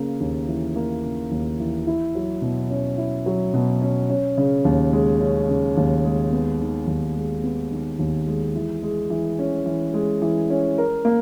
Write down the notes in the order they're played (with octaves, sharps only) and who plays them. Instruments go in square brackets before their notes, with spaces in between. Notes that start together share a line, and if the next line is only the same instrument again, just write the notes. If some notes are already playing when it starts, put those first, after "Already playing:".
Already playing: [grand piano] C#3 A#3
D#2
E3
A#3
C#3
D#2
E3
E4
F#3
B2
C#4
E4
F#3
B2
C#4
C#4
C#3
D#2
G#3
C#4
C#3
D#2
G#3
B3
D#3
D#2
G#3
B3
D#3
D#2
G#3
E3
G#3
E3
C#4
E3
G#3
E3
C#4
A#4
A#3